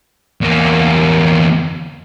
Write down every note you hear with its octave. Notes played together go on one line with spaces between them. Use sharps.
E2 A#3